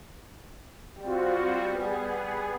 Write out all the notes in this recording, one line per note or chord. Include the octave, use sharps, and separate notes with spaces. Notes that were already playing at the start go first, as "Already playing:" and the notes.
G3 C4 F4 F#4
B3 G#4